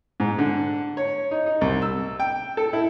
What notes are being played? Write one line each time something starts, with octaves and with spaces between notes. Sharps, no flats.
G#2
D3
C#5
D#4
D#4
C2
E6
G5
A4
E4